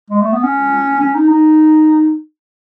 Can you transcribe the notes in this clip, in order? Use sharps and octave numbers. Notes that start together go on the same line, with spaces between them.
G#3
A3
B3
C#4
C#4
D#4
D#4